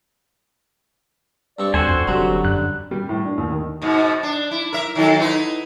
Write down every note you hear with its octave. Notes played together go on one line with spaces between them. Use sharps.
G2 C4 D5 C#6
D#2 C4 D4 F#4 A4 C5 G#5
F2
F1 D3 F#3 G3 C4 F#4 G4
F#2 F#6
G3
A2
D4
D#2
D#3
G#2 B2
D4
E4
A#4 E5
D#3 F#3 A4
D#4 E4 B4